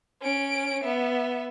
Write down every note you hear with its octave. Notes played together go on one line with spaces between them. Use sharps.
C#4 D7
B3 E5